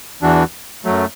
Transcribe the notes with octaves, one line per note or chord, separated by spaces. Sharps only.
E2 E3 D4 F#4
F#2 F#3 A3